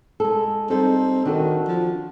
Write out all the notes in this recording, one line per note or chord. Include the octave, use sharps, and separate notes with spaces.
G#3 A4
G3 C4 D#4 A4
D#3 D4 F#4 A4
F3